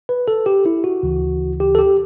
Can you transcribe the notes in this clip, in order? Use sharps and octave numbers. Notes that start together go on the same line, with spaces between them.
B4
A4
G4
E4
F#4
D2 C#3 E3
G4
A4
G4